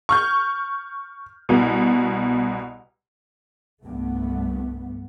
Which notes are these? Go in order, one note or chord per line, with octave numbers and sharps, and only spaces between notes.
C#6 F6 G6
C2 B2
C2 G2 A3 B3